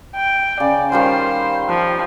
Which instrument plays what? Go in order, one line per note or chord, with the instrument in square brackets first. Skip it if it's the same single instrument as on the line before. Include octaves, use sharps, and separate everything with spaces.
[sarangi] G5
[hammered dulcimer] C#3 [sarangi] D5
[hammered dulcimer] D#3 G3 F4 [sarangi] C5
[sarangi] F3